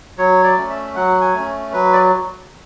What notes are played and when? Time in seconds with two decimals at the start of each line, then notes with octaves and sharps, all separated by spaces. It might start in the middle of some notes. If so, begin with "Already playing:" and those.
0.18 F#3 C#5
0.44 D5
0.57 A3 C#4
0.70 E5
0.95 F#3 F#5
1.21 G#5
1.34 A3 C#4
1.73 F#3 B4
1.93 D5